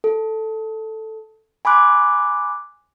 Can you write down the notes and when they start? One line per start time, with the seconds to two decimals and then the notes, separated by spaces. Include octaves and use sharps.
0.04 A4
1.65 G#5 B5 C6 D6 F#6